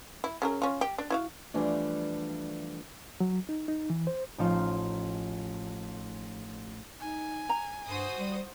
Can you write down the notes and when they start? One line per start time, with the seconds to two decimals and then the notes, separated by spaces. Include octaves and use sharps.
0.24 E4
0.42 C#3 F#3 A#4
0.62 C#4 F4
0.81 G4
0.98 D4
1.10 E4 F#4 F5
1.54 E3 F3 G3 A3 D4
3.20 F#3
3.49 D#4
3.68 D#4
3.90 E3
4.07 C5
4.38 A1 F3 D#4 F4 C5
7.00 D#4 G#5
7.49 A#5
7.86 G2 F#4 C5 D#6
8.18 G3